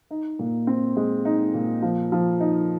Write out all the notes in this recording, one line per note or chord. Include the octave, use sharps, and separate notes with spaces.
D#4
A#2
C4
G#3
D#4
A#2
F3
F3
D#4